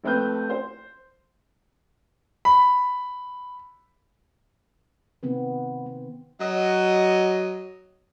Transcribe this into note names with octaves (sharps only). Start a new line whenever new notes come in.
A#1 A3 C4 B4 G6
C5
B5
C3 D#3 B3 C4 B4
B3
F#3 D#5